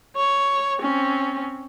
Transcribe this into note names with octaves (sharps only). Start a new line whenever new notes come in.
C#5
C4 C#4